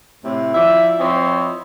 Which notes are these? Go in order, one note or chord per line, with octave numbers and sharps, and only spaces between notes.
A2 C3
F3 E4 D5 E5
F3 C4 E4 C5 C#5 D#5